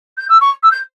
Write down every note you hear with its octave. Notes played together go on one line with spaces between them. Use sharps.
G6
E6
C#6
E6
G6